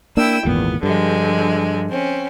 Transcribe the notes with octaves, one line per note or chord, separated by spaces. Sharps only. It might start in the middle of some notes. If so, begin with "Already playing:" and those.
A#3 D4 E4 G5 E6
G#1 E2 A#2 B3
G2 D3 F3 G#3
C4 C#4